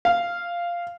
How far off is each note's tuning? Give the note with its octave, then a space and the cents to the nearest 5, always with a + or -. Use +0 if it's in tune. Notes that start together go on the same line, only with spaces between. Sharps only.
F5 -10